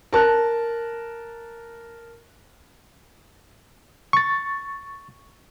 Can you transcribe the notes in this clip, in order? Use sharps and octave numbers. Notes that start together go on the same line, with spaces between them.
A#4 A5 F#6
C#6 A6